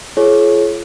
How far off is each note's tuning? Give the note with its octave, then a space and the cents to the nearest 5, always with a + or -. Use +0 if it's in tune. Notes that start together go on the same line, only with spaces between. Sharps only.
F4 -30 G#4 +40 C#5 -20